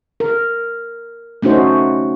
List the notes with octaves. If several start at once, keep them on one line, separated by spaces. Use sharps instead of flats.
A#4
A3 C#4 D#4 F#4 C5